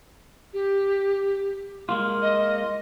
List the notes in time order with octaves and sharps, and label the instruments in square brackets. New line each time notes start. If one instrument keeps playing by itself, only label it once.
[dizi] G4
[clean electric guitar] G#3 A#3 F4
[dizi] D#5